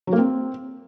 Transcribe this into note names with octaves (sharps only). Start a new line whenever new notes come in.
F#3
A#3
C4